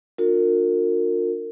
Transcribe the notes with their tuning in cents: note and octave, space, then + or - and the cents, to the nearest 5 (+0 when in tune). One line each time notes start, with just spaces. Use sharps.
D4 +10 F4 +45 A#4 -35